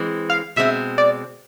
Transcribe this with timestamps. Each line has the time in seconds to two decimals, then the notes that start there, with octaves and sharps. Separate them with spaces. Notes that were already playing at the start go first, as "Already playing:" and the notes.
Already playing: E3 G#3 C4
0.30 F5
0.56 B2 G#3 C4 E5
0.98 D5